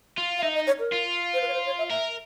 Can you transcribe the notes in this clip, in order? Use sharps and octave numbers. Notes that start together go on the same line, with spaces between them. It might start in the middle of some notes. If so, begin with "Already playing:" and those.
F4
F5
D#4 E5
D#5
C#5
A#4
F4
C5
B4
C#5
C5
C#5
E5
A#4 E5